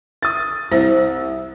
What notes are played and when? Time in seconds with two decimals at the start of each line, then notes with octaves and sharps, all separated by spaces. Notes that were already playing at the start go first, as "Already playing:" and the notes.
0.23 D#6 A6
0.72 C2 C5